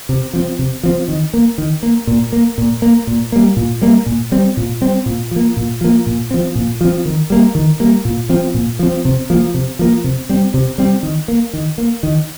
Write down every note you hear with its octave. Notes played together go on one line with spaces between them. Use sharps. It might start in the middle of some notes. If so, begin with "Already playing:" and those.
C3
F3 C4
C3
F3 C4
D#3
A#3
D#3
A#3
A#2
A#3
A#2
A#3
A#2
G3 A#3
A#2
G3 A#3
A#2
G3 C4
A#2
G3 C4
A#2
F3 A#3
A#2
F3 A#3
A#2
F3 C4
A#2
F3 C4
D#3
G3 A#3
D#3
G3 A#3
A#2
F3 C4
A#2
F3 C4
C3
F3 A#3
C3
F3 A#3
C3
G3 C4
C3
G3 C4
D#3
A#3
D#3
A#3
D#3